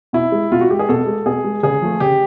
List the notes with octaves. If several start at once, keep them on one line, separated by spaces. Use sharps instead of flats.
B2 E4
G#3
B2 F4
F#4
G#3 G4
G#4
B2 A4
G#3
B2 G#4
G#3
C#3 G#4
F3 A3
C#3 G4